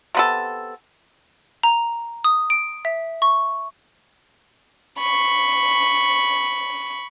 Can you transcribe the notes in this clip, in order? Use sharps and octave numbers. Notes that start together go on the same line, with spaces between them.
C3 B3 A4
A#5
D#6
D7
E5
C#6
B5 C#6